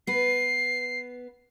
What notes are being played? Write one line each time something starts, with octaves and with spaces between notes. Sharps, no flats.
B3 B4 C7